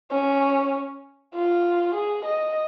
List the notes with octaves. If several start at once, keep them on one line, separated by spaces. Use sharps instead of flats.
C#4
F4
G#4
D#5